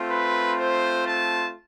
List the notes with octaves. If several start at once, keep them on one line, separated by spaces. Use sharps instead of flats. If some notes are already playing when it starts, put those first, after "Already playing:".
Already playing: A3 C4 F4
B4
C5
A5